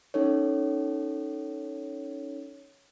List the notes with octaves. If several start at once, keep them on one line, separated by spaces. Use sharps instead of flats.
C#4 D#4 A4 C#5